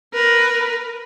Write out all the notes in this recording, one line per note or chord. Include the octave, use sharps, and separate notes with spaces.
A#4 B4